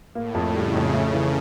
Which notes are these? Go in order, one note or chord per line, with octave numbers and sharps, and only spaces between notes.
A2 A#3
F2
C#3 G3
F2
C#3 A3
E3